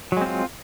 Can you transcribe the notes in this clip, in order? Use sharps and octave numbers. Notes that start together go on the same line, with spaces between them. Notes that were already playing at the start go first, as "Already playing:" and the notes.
F#3 G#3 C4 F4